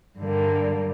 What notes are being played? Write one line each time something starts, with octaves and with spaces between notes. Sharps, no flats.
G2 D3 G3 A#3